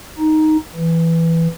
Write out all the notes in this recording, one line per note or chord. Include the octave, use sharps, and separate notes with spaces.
D#4
E3